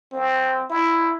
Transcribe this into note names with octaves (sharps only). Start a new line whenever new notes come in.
C4
E4